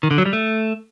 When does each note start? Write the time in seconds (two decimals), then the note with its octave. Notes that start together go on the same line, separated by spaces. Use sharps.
0.03 D#3
0.11 D3
0.18 F#3
0.25 G3
0.33 A3